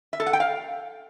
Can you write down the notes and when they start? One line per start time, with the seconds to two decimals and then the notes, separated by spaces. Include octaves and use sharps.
0.13 E5
0.20 A4
0.26 F#5
0.33 G5
0.40 F5